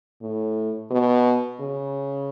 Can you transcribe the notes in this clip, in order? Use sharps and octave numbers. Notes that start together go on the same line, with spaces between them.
A2
B2
C#3